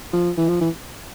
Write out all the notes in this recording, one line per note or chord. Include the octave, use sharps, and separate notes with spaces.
F3
E3
F3
E3